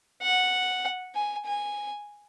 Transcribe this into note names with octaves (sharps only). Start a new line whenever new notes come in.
F#5
G#5
G#5